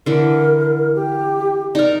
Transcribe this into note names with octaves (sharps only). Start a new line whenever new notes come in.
D3 E3 A#4
G4
D#4 A#4 D5